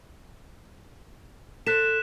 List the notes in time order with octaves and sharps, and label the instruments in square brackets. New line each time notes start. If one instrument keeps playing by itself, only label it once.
[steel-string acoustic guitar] A4 C5 [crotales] F#6 B6 E7